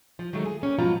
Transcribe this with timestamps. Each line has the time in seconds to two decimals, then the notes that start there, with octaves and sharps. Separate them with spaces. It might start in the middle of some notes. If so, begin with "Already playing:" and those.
0.19 F3
0.33 D#3 F#3 G#3 A3
0.44 F4 G#4
0.61 A#3 C#4 G4
0.79 G#2 B2 F3 F#3 F4 A#5